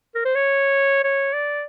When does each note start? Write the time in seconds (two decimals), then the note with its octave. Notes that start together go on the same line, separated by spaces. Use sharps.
0.15 A#4
0.25 C5
0.35 C#5
1.04 C#5
1.33 D5